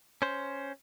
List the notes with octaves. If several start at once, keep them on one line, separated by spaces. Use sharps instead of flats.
C#4 C5